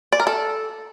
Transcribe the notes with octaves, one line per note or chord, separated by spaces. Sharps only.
D5
A#4
A4